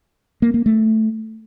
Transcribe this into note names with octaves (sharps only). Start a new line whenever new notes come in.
A#3
A#3
A3